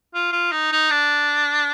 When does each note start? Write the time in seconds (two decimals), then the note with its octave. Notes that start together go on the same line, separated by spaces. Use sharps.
0.14 F4
0.32 F4
0.52 D#4
0.72 D#4
0.90 D4